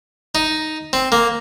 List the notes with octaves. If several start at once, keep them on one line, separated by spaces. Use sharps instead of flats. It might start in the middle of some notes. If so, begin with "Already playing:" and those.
D#4
C4
A#3